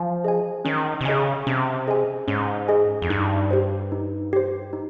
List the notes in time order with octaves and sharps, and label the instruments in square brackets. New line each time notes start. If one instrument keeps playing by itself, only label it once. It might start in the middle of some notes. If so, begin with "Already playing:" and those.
Already playing: [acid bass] F3
[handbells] G#4 D#5 G#5
[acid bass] D#3 [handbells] C#4
[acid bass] C3
[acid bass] C#3 [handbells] G#4 D#5 G#5
[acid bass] C3 [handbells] C#4
[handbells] G#4 D#5 G#5
[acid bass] G#2 [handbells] C#4
[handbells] G#4 D#5 G#5
[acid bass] F2
[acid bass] G2 [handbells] D#4
[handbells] G4 C5
D#4
G4 C5
D#4